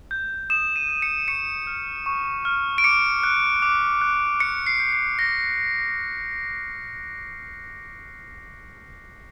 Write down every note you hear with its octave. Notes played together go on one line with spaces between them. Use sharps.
G6
D#6 E7
D#7
G6
C#7
C#6 C#7
F6
C#6
F6
D7
D6 C#7
F#6
D6
F#6
D6 C#7
C7
G6
C7
D6 A#6